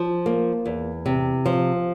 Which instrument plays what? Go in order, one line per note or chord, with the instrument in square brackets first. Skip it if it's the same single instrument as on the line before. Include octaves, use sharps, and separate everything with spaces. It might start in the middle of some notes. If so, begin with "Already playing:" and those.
Already playing: [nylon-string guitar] F3
A#3
E2
C3
F3